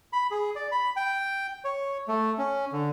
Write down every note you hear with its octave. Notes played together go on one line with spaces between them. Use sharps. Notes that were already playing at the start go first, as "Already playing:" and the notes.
B5
G#4
D5
B5
G5
C#5
A3
C#4
D3